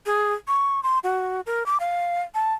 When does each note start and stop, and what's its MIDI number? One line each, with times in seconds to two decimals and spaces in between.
0.06 0.33 68
0.48 0.82 85
0.83 0.99 84
1.04 1.41 66
1.46 1.66 70
1.66 1.78 86
1.80 2.23 77
2.35 2.54 81